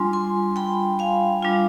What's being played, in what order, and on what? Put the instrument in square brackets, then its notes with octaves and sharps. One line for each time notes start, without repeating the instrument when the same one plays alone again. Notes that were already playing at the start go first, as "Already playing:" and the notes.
Already playing: [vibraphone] G3 D4 F4 G#5 C6
G#5 C6
G5 B5
F5 G#5
G3 D4 F4